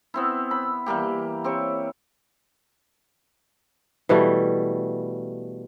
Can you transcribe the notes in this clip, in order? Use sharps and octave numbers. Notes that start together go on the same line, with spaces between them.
B3 C4 E4
B5
E3 G3 A#3 G4
C4 G4 C#5
B2 E3 G3 A3